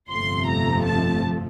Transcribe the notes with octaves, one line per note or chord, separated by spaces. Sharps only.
G1 F2 C3 F3 A3 C6
A#5
A5